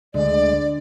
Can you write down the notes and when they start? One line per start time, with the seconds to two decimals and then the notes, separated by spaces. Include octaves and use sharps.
0.14 D2 D3 G#3 D5